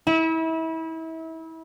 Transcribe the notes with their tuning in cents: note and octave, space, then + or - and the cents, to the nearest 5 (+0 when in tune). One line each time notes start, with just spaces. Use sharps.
E4 -30 E5 -35